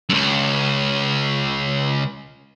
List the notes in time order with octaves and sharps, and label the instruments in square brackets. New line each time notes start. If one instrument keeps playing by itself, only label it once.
[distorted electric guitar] C#2 F#2